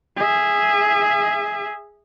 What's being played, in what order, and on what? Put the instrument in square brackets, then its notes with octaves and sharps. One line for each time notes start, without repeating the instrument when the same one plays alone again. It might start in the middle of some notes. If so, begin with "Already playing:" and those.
[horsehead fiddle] G#4 E5